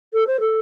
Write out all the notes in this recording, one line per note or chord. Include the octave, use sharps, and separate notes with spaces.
A4
C5
A4